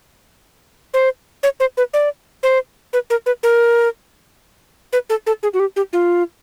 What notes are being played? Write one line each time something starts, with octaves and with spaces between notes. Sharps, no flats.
C5
C#5
C5
B4
D5
C5
B4
A#4
B4
A#4
B4
A4
A4
G#4
F#4
G4
G4
F4